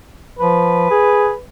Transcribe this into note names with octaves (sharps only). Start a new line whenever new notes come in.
F3 B4
G#4